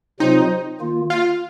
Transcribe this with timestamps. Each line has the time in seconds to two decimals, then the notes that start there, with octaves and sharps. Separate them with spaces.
0.20 C3 F#3 C4 D#4 F4 C5
0.80 D#3 A#3 F4
1.10 F4